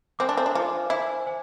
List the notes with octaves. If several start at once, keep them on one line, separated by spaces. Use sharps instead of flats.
C4 C5 G#5 D6
D4
C4
D4
F4 C5 G#5 D6
E4 C5 G#5 D6
C5 G#5